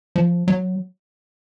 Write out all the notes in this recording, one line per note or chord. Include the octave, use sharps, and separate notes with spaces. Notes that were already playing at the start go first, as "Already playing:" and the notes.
F3
F#3